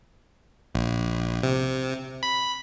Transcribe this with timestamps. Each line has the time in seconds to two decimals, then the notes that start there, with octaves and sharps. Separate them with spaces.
0.75 A#1
1.43 C3
2.23 B5